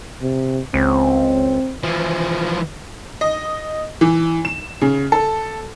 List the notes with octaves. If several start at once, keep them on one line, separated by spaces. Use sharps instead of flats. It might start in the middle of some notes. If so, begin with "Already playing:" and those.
C3
C#2 C4
E3 F3
D#5
E3
E7
C#3
A4